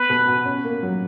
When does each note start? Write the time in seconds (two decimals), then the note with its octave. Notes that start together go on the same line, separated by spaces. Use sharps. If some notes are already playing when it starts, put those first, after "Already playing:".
Already playing: B3 B4
0.10 B2
0.27 F#4
0.46 C#4
0.65 A#3
0.83 F#3